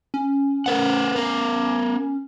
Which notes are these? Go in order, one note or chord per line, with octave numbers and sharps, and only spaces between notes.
C#4
A#4 B4 F#5
B3 A#4